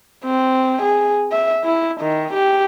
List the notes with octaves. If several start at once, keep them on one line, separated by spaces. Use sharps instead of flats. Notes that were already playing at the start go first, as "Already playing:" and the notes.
C4
G#4
E5
E4
D#3
G4